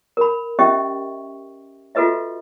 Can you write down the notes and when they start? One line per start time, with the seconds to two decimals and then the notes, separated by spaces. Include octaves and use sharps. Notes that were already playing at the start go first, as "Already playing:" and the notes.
0.17 A#4 B5
0.59 C#4 G4 D#5 E5 G5 C#6
1.95 F4 F#4 A4 B4 D#5 E5